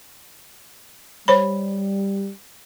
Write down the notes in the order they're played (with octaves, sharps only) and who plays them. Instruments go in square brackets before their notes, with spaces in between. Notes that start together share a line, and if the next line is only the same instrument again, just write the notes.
[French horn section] G3 [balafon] C5 C#5 B5